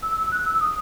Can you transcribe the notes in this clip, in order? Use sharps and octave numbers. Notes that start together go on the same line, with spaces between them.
E6
E6
F#6
E6
D#6